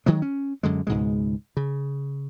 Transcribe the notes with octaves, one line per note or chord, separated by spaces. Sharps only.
D#3 F#3 G#3
C#4
F#2 D3 G#3
C#2 G#2 B2 G#3
C#3